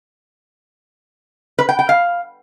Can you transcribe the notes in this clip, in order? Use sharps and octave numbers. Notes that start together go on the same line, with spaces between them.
B4
G5
G5
F5